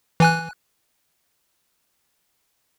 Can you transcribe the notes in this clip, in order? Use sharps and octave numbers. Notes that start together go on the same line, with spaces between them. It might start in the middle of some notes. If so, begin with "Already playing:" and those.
E3 G#5 F#6